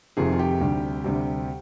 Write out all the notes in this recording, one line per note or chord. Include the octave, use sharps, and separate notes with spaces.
F1 F2 C3 D#3 F4 G#4
F4
G4
D2 C3 G3
D2 C3 G3